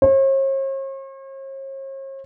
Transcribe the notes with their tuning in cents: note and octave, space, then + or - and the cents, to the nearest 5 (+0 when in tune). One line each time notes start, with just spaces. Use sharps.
C#5 -45